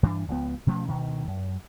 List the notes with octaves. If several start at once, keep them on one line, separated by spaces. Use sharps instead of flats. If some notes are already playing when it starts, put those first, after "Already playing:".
G2 E3 D4
C#2 F3 B3
B2 F3 A3 C#4
D2 B2 D#3
F#2